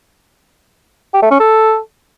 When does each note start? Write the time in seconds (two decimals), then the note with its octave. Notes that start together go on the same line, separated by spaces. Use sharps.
1.14 G4
1.22 A3
1.31 C#4
1.40 A4